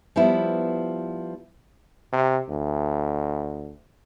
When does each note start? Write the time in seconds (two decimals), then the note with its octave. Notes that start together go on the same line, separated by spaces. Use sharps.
0.16 F3 G3 B3 E4
2.13 C3
2.49 D2